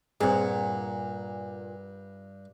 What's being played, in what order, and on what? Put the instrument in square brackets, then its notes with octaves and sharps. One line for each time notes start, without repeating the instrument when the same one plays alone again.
[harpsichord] G2 [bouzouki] A#2 F#5 [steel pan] C4 G#4